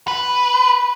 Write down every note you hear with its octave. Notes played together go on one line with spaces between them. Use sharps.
B4